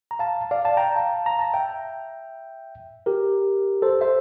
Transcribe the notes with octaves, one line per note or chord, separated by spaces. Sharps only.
A#5
F5 A5
D5 F5
F5 A5
G5 A#5
F5 A5
A#5
A5
E5 G5
G4 A#4
A4 C5
C5 E5